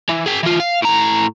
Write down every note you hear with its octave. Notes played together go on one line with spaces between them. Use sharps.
E3
G#4 G5
E3 F4
F5
A2 A#5